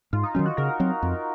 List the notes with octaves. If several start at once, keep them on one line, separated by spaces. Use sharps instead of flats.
G#2 F4
D#4
D#3 F#3 C#4 F4
F#4
C#3 A#4
F#3 C4
F2